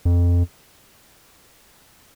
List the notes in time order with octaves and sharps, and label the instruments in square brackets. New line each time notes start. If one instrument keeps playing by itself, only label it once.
[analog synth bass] F2